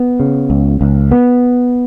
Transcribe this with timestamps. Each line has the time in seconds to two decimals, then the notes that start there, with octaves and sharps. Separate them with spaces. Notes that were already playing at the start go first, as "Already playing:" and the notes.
Already playing: B3
0.20 C#3
0.50 C#2
0.81 C#2
1.11 B3